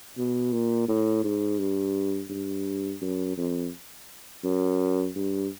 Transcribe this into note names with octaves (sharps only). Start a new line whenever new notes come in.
B2
A#2
A2
G#2
G2
G2
F#2
F2
F#2
G2